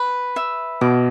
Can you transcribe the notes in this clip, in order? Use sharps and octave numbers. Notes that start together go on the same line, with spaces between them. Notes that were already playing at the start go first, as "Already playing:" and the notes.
Already playing: B4
E5
B2 D6